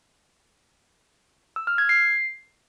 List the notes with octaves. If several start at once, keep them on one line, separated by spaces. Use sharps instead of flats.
E6
F6
G#6
C7